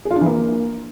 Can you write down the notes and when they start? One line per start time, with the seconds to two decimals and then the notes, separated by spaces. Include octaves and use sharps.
0.05 G#4
0.11 F4
0.16 D4
0.21 E3
0.26 A#3